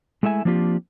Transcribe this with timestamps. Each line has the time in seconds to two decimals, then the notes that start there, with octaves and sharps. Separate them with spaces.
0.23 G#3 A3 E4 E5 G#5
0.45 F3 A#3 C4 D4 F4 G4